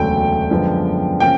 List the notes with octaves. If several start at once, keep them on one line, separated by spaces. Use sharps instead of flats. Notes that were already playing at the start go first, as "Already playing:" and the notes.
Already playing: E1 D2 C#3 F#3 A3 G5
F#2 D3 F3 G#3 B3
C#3 F3 A#3 C#4 G5